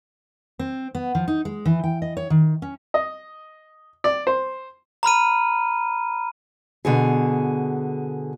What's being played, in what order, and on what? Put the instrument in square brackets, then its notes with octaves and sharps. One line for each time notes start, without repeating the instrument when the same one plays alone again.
[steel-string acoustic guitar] C4
B3
F3
D#4
G#3
E3
G5
D#5
C#5
D#3
C#4
[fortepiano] D#5
D5
C5
[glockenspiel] A#5 B5 F6 D#7
[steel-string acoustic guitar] B2 D3 G#4